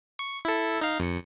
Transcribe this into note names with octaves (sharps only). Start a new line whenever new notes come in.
C#6
E4 A4
D#4 F5
F2 C#7